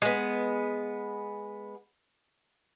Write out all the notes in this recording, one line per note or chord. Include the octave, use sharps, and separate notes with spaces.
G#3 B3